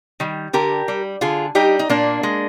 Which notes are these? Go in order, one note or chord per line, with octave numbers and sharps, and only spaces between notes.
D#3 G3
D3 G4 A#4
G3
D3 F4 G#4
G3 D#4 G4
D#4
A#2 A#3 D4
G#3